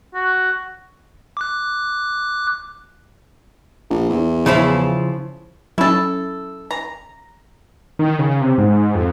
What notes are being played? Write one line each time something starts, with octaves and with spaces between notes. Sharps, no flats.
F#4
D6 F#6
A#1
E2
C#3 F3 E4
F#3 C#4 E4 A4
A#5
D#3
C#3
C3
G#2
F2